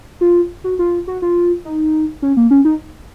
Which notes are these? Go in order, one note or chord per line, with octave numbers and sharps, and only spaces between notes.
F4
F#4
F4
F#4
F4
D#4
C#4
A#3
C#4
D#4